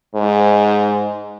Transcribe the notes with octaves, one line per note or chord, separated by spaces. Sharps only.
G#2